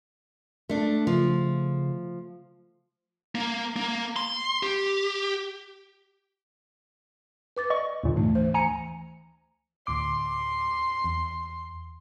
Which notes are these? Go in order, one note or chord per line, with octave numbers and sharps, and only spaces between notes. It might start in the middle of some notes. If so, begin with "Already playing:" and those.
A3 D4
C#3 F3
A#3
A#3
C6
G4
B4 D6 A6
D5 D#5 C#6
D#2 A#2 D3
G#2 E3 A3
D2 E3 C5
G#5 A#5 C#7
D2 A2 C6 D6
E2